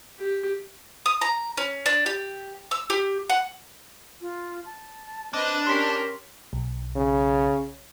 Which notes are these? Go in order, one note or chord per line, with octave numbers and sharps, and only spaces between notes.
G4
D#6
A#5
C#4
D4
G4
E6
G4
F#5
F4
A5
C4 D4 B4 D#5
C#4 G4 A#4 C6 B6
B1
C#3